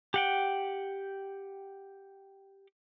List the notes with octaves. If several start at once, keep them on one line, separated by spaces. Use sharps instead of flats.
G4 F#5 G5